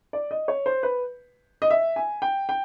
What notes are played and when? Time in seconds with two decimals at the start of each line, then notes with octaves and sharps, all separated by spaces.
0.13 D5
0.31 D#5
0.48 C#5
0.66 C5
0.83 B4
1.62 D#5
1.70 E5
1.96 G#5
2.22 G5
2.49 G5